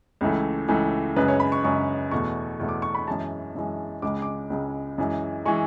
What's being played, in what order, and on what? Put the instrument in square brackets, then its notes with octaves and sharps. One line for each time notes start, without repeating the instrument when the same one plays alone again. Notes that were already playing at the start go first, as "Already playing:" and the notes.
[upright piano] C#2 C#3 E3 A3
C#2 C#3 E3 A3
F#2 C#3 G#3 B4
C#5
B5
C#6
F#2 C#3 G#3 C#6
E2 B2 A3 C#6
E2 B2 A3
D6
C#6
B5
F#2 E3 G#3 A5
F#2 E3 G#3
C#2 C#3 G#3 D6
D6
C#2 C#3 G#3
F#2 E3 G#3
E3 G#3 C#6